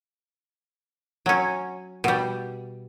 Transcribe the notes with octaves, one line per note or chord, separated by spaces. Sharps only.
F#3 C#4
B2 G3